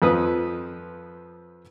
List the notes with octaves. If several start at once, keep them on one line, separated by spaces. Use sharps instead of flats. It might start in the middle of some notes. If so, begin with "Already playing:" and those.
F2 F3 B4 D#6